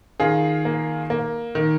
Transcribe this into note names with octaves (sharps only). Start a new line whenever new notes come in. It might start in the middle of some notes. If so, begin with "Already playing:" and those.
D#3 F4 G#4
A#3
A#3
D#3